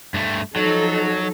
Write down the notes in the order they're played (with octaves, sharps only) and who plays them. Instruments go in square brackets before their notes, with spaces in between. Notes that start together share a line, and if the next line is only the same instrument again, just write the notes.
[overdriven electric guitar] G2 A3
[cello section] F3 D#4 A4 [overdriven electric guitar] F#3